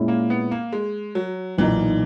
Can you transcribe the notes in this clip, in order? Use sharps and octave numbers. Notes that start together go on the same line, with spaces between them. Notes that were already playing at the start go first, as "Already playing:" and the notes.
Already playing: A#2 G#3 C#4 E4
A#3
B3
A#3
G#3
F#3
B1 A#2 E3 A#3 D#4